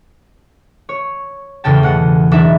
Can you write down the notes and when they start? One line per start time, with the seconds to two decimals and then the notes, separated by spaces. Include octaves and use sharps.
0.89 C#5
1.64 E2 A2 C#3 G5 A5
1.83 B2 F#5
2.31 E1 E3 F#3 D4 D#4 E5